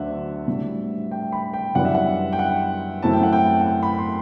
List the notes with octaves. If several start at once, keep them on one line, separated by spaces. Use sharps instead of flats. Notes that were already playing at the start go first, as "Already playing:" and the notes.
Already playing: D2 D3 F#3 D4 E5 F#5
A2 G3 B3 D4
G5
B5
G5
F#2 E3 G3 B3 D4 F#5
E5
F#5
G5
F#5
F#2 E3 A3 C4 E4 A5
G5
F#5
G5
F#5
G5
B5
C6